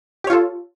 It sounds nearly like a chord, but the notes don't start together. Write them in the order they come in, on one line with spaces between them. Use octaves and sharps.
G4 C#5 F4 A4